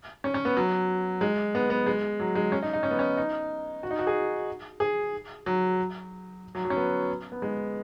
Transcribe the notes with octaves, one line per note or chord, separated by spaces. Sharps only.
C#4
C#4
B3
F#3
G#3
B3
B3
G#3
F#3
G#3
C#4
D#4
D#4
C#4
B3
C#4
D#4
F#4
D#4
F#4
G#4
G#4
F#3
F#3
F#3
C#4
B3
B3
G#3